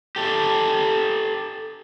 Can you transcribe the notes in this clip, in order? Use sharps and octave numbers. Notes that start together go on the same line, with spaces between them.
G4 A4